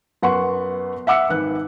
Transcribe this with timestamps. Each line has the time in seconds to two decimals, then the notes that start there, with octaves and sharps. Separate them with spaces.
0.22 F#2 B3 F#5 C6 C#6
1.07 E5 F#5 D6 E6 C#7
1.30 G#1 B4 F#6